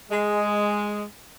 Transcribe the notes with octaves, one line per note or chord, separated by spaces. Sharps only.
G#3